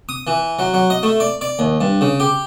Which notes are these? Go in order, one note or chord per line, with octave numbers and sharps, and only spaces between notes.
D#6
E3
F#3
F#3
D#5
A3
D5
D5
D#2
G2
C#3
G4